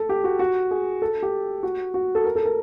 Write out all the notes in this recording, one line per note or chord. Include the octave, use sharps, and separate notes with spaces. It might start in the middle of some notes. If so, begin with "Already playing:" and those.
Already playing: A4
G4
F#4
F#4
G#4
A4
G4
F#4
F#4
A4
A#4
A4
A#4